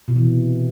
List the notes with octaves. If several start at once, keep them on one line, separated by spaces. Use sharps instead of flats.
B2
E3
C3